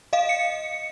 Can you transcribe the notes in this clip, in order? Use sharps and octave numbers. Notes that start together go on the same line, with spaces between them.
D#5 F5
C#7